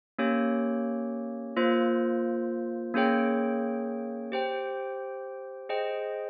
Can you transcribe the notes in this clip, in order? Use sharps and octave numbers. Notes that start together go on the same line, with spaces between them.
A#3 C#4 G4 C#5
A#3 F4 C5
A#3 C#4 G#4 C#5 G5
G4 C5 G5
G#4 C5 D#5 G5